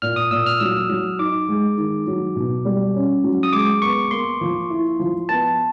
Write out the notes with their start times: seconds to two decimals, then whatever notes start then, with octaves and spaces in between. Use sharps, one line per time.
0.02 A#2 F6
0.16 D#6
0.31 A#2 E6
0.46 F6
0.60 F#3 E6
0.89 F#3
1.19 D#4 D6
1.49 G#3
1.77 D#3
2.07 F#3
2.36 B2
2.65 G3
2.95 C#4
3.24 F#3
3.43 D#6
3.53 G#3 D6
3.82 B3 C#6
4.11 A#3 C6
4.41 F3
4.70 E4
4.99 F3
5.29 B3 A5